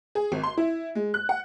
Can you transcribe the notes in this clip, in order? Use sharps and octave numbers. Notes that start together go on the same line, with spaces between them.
G#4
G#1
C6
E4
G#3
F#6
F#5